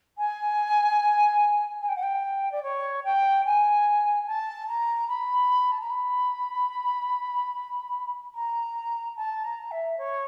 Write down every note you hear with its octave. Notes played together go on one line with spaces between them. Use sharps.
G#5
G#5
G5
F#5
G5
D5
C#5
G5
G#5
A5
A#5
B5
A5
A#5
B5
A#5
A5
A#5
E5
C#5